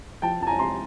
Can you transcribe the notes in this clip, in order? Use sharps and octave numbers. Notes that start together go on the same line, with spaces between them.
F3 G5 A5
F2 A5
G#5 A#5
C3 A#5 C6